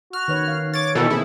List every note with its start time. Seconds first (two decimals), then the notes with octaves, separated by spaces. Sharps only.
0.13 F#4 F6
0.28 D#3 B4 C#5
0.48 F5
0.73 C#5 D6 A6
0.95 B2 D#3 E3 A4
1.10 A#3 C4 E4 G#4